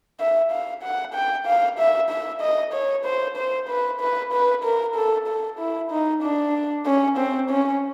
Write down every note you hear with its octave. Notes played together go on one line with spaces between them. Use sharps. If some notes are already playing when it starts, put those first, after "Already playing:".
E5
F5
F#5
G5
F5
E5
E5
D#5
C#5
C5
C5
B4
B4
B4
A#4
A4
A4
E4
D#4
D4
C#4
C4
C#4